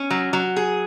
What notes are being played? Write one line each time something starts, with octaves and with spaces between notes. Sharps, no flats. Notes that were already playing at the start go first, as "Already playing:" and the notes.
Already playing: C#4
F#3
F#3
G#4